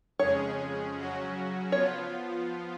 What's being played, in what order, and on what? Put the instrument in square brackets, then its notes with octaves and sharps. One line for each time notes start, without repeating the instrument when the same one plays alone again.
[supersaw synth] F2 C#3 G#3 C#4 G#4 [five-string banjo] C#5
[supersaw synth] C#3 F#3 C#4 F#4
[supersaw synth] F3 B3 F4 [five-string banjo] C#5